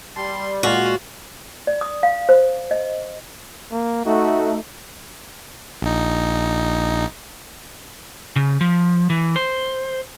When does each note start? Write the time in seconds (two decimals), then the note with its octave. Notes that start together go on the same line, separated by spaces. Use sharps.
0.16 G3 A5 C6
0.63 A#2 G#3 F4 F#4 D5
1.67 D5
1.81 D#6
2.03 F5
2.29 C5
2.71 D#5
3.71 A#3
4.06 A3 D#4 F#4
5.82 A#1 D#4
8.36 C#3
8.61 F3
9.10 E3
9.36 C5